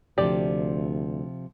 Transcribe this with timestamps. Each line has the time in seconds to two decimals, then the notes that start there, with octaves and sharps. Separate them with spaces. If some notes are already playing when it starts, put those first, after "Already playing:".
0.18 D2 C3 F3 G4 D5